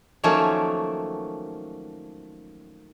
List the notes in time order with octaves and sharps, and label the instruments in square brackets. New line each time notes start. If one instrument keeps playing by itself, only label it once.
[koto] D#3 F3 F#3 A3 A#3 C#4